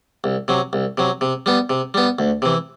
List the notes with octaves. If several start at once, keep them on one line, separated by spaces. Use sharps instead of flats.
C2
C3 F#3
C2
C3 F#3
C3
G3 B3
C3
G3 B3
D2
C3 E3